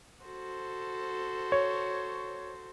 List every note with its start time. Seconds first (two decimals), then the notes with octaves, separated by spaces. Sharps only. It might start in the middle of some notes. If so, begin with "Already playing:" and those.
0.23 F#4 A4 C5
1.52 C#5